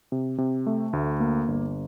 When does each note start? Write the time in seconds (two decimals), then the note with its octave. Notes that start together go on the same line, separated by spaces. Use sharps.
0.12 C3
0.38 C3
0.67 A3
0.93 D2
1.20 A#3
1.48 G1